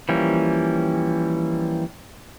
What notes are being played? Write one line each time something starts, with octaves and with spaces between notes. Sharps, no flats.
E3 F3 G3 A#3 C#4